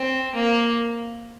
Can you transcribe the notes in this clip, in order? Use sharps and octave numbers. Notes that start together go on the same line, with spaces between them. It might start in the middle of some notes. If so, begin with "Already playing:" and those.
Already playing: C4
A#3